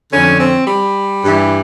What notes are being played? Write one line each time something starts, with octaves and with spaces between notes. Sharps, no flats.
F2 D3 C#4
C4
G3
G2 E3